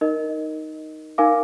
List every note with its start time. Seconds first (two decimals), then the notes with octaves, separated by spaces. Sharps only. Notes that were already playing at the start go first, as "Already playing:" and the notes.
0.01 D#4 A#4 D#5
1.18 D#4 A#4 F5 G#5 D6